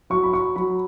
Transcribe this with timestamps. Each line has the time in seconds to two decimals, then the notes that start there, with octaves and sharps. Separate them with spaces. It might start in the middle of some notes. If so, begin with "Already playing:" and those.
0.10 F#3 C#6
0.23 B5
0.33 C#6
0.56 F#3 B5